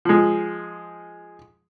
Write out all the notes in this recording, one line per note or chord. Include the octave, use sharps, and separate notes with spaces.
F3 G#3